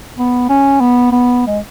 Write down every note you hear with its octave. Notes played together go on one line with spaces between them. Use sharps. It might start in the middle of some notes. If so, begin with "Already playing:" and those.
B3
C#4
B3
B3
G#3